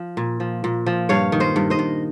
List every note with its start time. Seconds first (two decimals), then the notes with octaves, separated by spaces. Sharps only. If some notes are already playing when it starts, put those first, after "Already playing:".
Already playing: F3
0.17 A#2
0.40 F3
0.64 A#2
0.86 F3
1.09 G2 C#5 F5
1.32 D#3
1.40 C5 D#5
1.56 G2
1.70 C5 D#5
1.79 G2